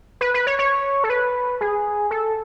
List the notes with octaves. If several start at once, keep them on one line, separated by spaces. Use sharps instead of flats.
B4
B4
C#5
C#5
A4
B4
G#4
A4